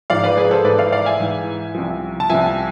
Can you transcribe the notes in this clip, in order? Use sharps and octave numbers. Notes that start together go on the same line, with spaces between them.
G#2 F3 D5 F5
B4 D5
G#4 B4
A4 C5
G#2 E3 B4 D5
D5 F5
D5 F5
E5 G#5
G#2 E3
C2 C3 F3
A5
C2 C3 F3 E5 G#5